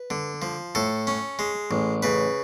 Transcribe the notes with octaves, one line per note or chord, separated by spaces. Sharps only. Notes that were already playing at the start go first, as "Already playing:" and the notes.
Already playing: B4
D3
F3
A2 A4
C#4
G#3
A1
C#3 B4